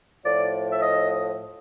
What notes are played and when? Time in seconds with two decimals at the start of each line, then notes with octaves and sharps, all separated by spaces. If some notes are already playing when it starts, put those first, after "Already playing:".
0.24 A2 F3 D5
0.71 E5
0.82 D#5